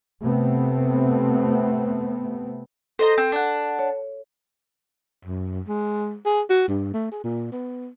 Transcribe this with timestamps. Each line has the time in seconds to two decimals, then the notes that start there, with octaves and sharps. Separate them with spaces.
0.23 C3 A3 B3 C4
2.99 A4 C5 D#5 A#5
3.18 C4
3.32 D4 F#5
3.79 C#5
5.24 F#2
5.68 G#3
6.25 G#4
6.50 F#4
6.68 G2
6.94 A3
7.12 G#4
7.24 A#2
7.52 B3